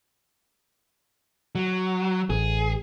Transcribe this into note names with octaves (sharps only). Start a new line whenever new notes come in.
F#3
A1 G#4